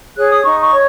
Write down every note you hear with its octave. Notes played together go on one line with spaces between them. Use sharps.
G#4 C#5 F#6
D#6
D#4 C#6
C#6
C#5